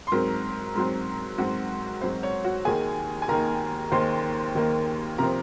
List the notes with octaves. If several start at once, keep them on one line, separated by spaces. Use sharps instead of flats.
C6
G#2 F#3 C4 A#4 A#5
G#2 F#3 C4
G#2 F#3 C4 F#4 F#5
G#2 F#3 C4 C5
C#5
F#4 F#5
D#2 D#3 A#3 G#4 G#5
G#5
D#2 D#3 A#3 A#4 A#5
D#2 D#3 A#3 C5 C6
D#2 D#3 A#3
C3 F3 C4 A#4 A#5